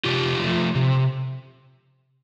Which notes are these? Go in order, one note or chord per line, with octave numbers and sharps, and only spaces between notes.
C3 F4 G4
F3 A3
C3